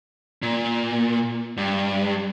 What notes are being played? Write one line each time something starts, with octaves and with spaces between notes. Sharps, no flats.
A#2
G2